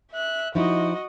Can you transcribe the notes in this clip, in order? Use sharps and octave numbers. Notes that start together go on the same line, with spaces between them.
E5 F#6
F3 D#4 E4 F#4 D#5